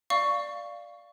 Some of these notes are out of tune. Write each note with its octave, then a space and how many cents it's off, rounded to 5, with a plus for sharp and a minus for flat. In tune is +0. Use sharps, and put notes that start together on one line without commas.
D5 +0 F5 -5 C#6 +10